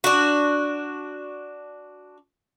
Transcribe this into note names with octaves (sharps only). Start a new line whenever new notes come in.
D4 F#4